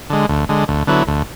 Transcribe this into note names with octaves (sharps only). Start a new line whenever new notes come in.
D3 G#3
D2
D3 G#3
D2
D3 F#3 B3 E4
D2